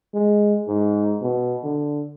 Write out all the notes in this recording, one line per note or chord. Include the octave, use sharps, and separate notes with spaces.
G#3
G#2
B2
D3